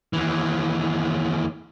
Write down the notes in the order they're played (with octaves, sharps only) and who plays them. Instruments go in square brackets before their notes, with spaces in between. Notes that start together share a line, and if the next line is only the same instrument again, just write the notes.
[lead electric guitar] D#2 E3